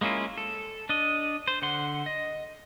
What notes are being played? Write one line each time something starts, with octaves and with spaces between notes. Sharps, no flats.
G#3 A#3 C#4 E4 F4
A4
D4 D#5
C5
D3 F#5 C6
D#5